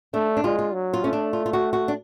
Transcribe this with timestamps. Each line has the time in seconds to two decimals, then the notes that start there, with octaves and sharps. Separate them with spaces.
0.14 A3 D4
0.37 D4
0.44 G#3 F4
0.59 F4
0.73 F#3
0.94 F4
1.04 A3 C#4
1.13 D4
1.33 F4
1.46 F4
1.53 F#4
1.73 F#4
1.88 D4